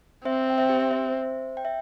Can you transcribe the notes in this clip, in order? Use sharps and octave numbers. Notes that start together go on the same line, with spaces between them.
C4 C5 E5
G5
C5 E5
G4
C5 E5
C5 E5
G5
E5